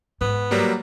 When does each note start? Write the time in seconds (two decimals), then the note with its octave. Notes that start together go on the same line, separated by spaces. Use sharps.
0.21 G#2 B3
0.51 F#3 G3 A#3